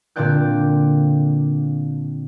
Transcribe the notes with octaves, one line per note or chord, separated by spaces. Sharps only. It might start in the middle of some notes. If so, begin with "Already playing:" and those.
A#2 D3 C4 D5 G5 F#6